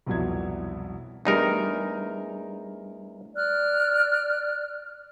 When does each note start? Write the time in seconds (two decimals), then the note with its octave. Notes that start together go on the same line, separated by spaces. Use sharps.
0.06 C2 F2 B2 F#3 E4 G#6
1.25 E2 G3 A3 D4 D#4 A#4
3.35 D5 F6 F#6